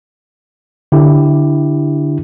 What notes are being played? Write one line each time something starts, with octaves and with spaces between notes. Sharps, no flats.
D3 D4 E4 G4